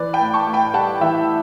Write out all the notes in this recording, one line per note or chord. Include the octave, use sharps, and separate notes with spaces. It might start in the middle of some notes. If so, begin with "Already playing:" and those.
Already playing: E3 B4 D5
G5 B5
A2
A5 C#6
A2
G5 B5
G3 F#5 A5
E3 E5 G5